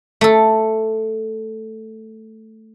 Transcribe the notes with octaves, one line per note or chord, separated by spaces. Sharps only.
A3 A4